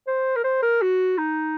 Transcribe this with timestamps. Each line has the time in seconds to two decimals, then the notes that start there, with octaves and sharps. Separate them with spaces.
0.07 C5
0.36 A#4
0.44 C5
0.63 A#4
0.81 F#4
1.18 D#4